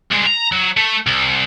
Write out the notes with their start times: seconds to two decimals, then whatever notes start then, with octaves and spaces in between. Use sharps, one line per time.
0.11 C2 G#3
0.26 A#5
0.52 F#3
0.77 A3
1.07 C2